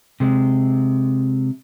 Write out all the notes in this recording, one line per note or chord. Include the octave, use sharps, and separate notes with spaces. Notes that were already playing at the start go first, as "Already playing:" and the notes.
C3 G#3